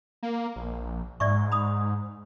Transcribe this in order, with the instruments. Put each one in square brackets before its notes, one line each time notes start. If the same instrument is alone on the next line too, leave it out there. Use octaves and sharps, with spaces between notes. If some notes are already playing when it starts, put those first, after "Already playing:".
[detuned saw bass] A#3
A#1
[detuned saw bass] G#2 [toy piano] D5 E5 C#6
[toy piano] B5 D#6